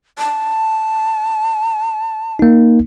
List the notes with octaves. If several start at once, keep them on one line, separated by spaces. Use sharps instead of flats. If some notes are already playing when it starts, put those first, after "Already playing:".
A5
A#3 D#4